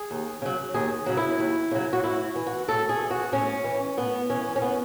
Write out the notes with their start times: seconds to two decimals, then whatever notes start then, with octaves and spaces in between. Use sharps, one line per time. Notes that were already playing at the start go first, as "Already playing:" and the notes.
Already playing: G#4
0.11 D#2
0.42 C#3 F#3
0.74 D#2 G#4
1.06 C#3 F#3
1.17 E4
1.39 D#2
1.71 C#3 F#3
1.93 F#4
2.03 A2 E4
2.36 E3
2.47 F#4
2.68 A2 A4
2.89 G#4
3.00 E3
3.11 F#4
3.33 A2 C#4
3.64 E3
3.97 A2 B3
4.30 E3 C#4
4.56 C#4
4.62 B3